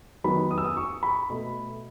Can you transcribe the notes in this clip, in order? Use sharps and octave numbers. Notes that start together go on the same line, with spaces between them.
D#3 F#3 B3 B5
D#6
E6
D#6
C#6
B5
B2 A3